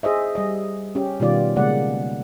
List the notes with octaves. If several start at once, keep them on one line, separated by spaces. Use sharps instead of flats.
G#4 C5 D#5 E5
G3 D#5
C#4 G4
B2 D#3 G3 B3 F4 D5
C#3 G#3 A#3 D5 F#5